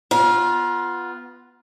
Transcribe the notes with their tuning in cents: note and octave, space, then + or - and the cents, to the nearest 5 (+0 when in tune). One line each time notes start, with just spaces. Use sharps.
B3 +0 F4 +0 A#5 +40